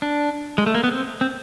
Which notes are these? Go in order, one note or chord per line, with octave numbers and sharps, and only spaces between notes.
D4
G#3
A3
A#3
B3
C4
C4